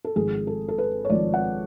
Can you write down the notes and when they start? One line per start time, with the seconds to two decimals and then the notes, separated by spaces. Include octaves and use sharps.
0.05 A4
0.16 G#1 G#2 F3 G#4
0.47 A4
0.68 A4
0.78 B4
1.05 C#5
1.10 G#1 G#2 F3 D5
1.34 F#5